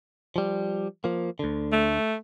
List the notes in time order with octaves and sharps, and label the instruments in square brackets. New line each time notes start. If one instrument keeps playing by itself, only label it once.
[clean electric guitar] F3 G3
F3 A#3
D2 D3
[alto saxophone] A3